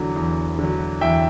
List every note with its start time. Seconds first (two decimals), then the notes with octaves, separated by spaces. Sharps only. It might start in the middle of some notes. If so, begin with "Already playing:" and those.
Already playing: E2 D3 F#3
0.16 E2
0.59 D3 F#3
1.01 E2 E5 G5